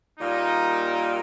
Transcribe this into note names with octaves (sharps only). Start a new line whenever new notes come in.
A#2 G3 A#3 D#4